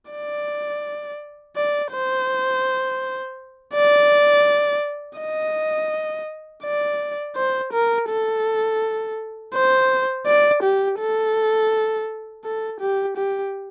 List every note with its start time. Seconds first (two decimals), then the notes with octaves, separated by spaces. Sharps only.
0.11 D5
1.56 D5
1.92 C5
3.74 D5
5.19 D#5
6.64 D5
7.36 C5
7.73 A#4
8.09 A4
9.54 C5
10.26 D5
10.63 G4
10.99 A4
12.44 A4
12.80 G4
13.17 G4